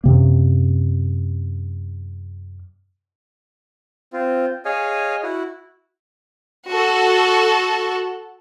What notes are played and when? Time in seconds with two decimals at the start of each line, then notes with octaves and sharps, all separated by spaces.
0.04 F#2 C3 A#3
4.13 C4 F4
4.65 G#4 C#5 D#5 F5 G#5
5.23 E4 F#4
6.70 F#4 A4